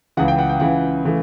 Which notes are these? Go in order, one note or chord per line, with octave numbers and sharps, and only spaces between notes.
C#2 C#3 E3 F#5
G5
F#5
G5
C#2 C#3 E3 F#5
C#3 E3 A3